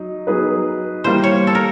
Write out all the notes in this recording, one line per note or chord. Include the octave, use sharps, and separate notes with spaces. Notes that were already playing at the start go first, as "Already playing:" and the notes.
Already playing: F#3 D#4
F#3 B3 D#4 G#4 B4
E3 G3 A#3 C5
C#5
A4
A#4